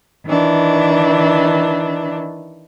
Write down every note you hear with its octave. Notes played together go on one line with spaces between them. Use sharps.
D#3 E3 D4